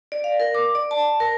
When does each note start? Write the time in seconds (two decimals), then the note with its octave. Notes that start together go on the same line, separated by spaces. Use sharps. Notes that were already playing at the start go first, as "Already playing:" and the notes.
0.12 D5
0.24 F5
0.40 A#4
0.55 D6
0.75 D5
0.91 A5
1.20 A#4